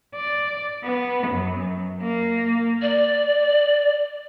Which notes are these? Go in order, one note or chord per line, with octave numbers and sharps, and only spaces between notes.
D5
B3
F#2
A#3
D5